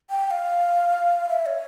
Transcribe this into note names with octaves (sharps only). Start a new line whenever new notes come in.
G5
G5
F5
E5
C#5